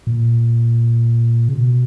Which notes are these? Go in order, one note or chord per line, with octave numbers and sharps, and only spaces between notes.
A#2
C#3
B2